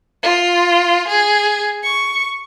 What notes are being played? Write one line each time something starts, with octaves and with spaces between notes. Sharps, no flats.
F4
G#4
C#6